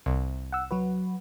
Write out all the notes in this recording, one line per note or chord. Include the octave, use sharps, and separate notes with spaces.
C2
F#5 E6
F#3 F#4 B4